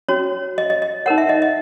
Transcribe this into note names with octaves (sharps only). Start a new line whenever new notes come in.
C#4 F#4 C#5
D#5
D#5
D#5
D#4 A#4 C#5 F#5
E5
D#5
D#5